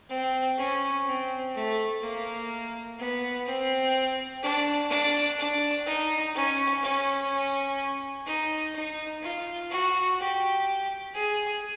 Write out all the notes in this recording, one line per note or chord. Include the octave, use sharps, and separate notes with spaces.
C4
C#4
C4
A3
A#3
B3
C4
D4
D4
D4
D#4
C#4
C#4
D#4
D#4
F4
F#4
G4
G#4